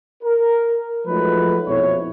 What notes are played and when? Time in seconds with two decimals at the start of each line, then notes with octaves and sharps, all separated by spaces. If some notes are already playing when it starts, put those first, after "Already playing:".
0.23 A#4
1.06 F3 F#3 G#3 A3 D#4 B4
1.67 A#1 F2 B2 E4 C#5